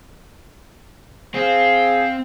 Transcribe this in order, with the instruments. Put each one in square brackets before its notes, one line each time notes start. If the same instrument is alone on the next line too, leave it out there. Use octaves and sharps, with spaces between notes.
[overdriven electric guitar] C4 [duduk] G#4 [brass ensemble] F5